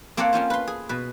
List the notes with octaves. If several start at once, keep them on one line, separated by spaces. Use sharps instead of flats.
A#3 C4 A4 C#5 D5 F#5
C4 C#4 F4 C5
B4 C6
G#4
B2 B4